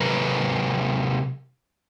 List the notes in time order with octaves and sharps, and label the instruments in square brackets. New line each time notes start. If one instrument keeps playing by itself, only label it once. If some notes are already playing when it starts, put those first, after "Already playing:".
[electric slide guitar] C3 F#3 A#4 B4